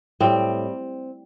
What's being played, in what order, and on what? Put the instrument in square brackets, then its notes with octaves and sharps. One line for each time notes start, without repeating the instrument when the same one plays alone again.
[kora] A2 G3 C4